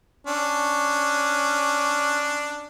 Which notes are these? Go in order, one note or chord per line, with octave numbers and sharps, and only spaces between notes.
C#4 D4